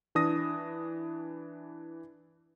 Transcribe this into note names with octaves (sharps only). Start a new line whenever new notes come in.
E3 D4 D#6 A#6